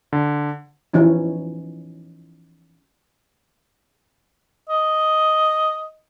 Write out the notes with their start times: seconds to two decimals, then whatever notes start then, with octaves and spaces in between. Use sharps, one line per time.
0.13 D3
0.94 E3 F3 C#4 D#4
4.70 D#5